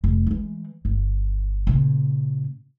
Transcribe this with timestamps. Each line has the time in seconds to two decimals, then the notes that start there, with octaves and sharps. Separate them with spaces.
0.04 F1
0.27 E3 G#3
0.85 G1
1.67 A#2 C#3